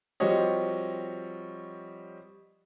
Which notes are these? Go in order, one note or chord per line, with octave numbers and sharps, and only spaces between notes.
F3 G3 C4 F#4 C#5 D#5